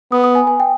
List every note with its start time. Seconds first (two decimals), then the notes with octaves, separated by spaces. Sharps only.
0.12 B3 D#6
0.24 D#6
0.35 G#5
0.47 G#5
0.60 G5